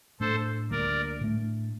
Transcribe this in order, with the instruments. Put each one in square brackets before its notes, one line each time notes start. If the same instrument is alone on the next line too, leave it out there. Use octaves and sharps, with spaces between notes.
[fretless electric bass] A2 A3 D4 [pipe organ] A4 C5
[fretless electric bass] D2 D3 G3 A#3 [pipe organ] A#4 D5
[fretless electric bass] A2 A3 D4